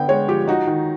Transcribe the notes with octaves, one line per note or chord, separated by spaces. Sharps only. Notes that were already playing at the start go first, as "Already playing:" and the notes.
Already playing: D3 B3 G5
G#3 C#5
F3 G4
D#4 F#4
D#3